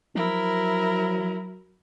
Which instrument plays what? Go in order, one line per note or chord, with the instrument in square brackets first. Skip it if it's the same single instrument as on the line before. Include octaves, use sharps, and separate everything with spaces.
[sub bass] F3 [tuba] F#3 [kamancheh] E4 A#4